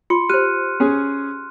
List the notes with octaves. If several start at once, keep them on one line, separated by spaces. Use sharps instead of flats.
F4 C6 C#7
G4 C5 F6 F#6 D#7
C#4 G#4